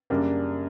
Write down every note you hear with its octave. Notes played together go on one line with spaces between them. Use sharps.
F#2 C#3 G3 A#3 D4